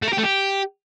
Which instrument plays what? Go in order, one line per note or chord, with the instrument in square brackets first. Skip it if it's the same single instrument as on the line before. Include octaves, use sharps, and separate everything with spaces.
[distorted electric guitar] A3
A#4
G4
A3
G4